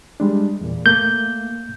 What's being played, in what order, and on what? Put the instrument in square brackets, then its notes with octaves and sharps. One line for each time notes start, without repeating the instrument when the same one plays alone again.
[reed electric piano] G3 G#3 D4
E2 A#2
[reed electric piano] A3 A#3 [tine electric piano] G6